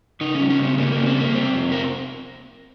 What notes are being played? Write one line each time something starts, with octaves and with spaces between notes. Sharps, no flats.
C#3 D#4
C#4
G3
C#4
C#3 C4
G3 A#3
C#3 A#3
C4
G3
A#3
C3 C4
F2
A#4